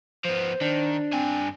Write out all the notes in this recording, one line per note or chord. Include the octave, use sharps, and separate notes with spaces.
F3 B3 C5
D#3 D4
G2 C4 G#5